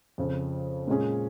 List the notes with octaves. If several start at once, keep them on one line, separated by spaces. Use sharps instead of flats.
F2 C#3 F3
A#2 G#3 C#4 G#4